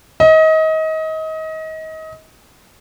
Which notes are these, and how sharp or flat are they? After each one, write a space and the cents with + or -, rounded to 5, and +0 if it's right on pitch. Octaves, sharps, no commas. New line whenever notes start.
D#5 +30